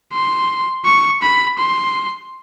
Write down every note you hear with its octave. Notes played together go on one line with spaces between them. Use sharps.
C6
C#6
B5
C6